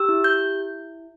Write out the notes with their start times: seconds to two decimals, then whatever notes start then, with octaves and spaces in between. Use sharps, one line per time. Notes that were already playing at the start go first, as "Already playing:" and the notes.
Already playing: G4 E6
0.09 E4
0.24 G6